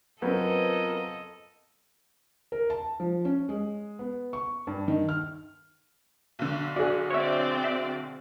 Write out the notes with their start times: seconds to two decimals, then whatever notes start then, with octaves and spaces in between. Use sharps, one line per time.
0.22 F#2 B3 C4 F4 A4 A#4 D#5
2.52 A#4
2.70 A5
3.00 F3
3.25 C#4
3.49 G#3
3.99 B3
4.33 C#6
4.67 G2
4.88 D#3
5.09 F6
6.39 B1 D3
6.76 F#4 G#4 D5
7.10 C4 C#5 D5 E5
7.64 E5